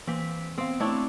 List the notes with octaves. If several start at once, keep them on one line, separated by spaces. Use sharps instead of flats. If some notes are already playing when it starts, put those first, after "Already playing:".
E3 A#3 C4 B6
B3 C4 F5
A3 C4 D4 E4 C#5 A5